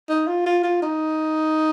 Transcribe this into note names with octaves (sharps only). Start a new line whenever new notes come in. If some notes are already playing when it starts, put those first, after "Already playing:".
D#4
F4
F4
F4
D#4